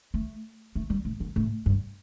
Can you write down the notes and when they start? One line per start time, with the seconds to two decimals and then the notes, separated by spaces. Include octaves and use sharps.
0.14 A3
0.75 A3
0.90 G3
1.05 A2
1.20 F#2
1.36 A2
1.66 G2